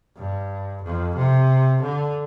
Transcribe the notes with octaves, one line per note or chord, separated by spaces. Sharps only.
G2
F2
C3
D3